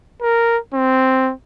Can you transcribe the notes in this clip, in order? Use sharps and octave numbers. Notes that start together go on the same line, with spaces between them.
A#4
C4